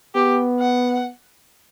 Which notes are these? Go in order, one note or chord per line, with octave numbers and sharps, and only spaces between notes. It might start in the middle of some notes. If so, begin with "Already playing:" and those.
B3 G4
F#5